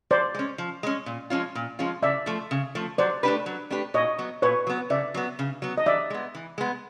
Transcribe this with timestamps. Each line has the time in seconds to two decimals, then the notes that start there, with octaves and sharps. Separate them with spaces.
0.11 F3 C5 D5
0.34 G#3 C#4
0.58 F3
0.83 G#3 C#4
1.06 A#2
1.30 F3 G#3 C#4 F4
1.55 A#2
1.79 F3 G#3 C#4 F4
2.02 C#3 D5 E5
2.26 F3 A3
2.51 C#3
2.75 F3 A3
2.98 F#3 C5 D5
3.23 A3 D4 G4 B4
3.46 F#3
3.70 A3 D4 G4 B4
3.94 A#2 C#5 D#5
4.19 F#3 B3
4.42 A#2 B4 C#5
4.67 F#3 B3
4.90 C#3 D5 E5
5.14 F#3 B3
5.39 C#3
5.62 F#3 B3
5.78 D#5
5.86 E3 D5 E5
6.10 G#3 B3
6.35 E3
6.58 G#3 B3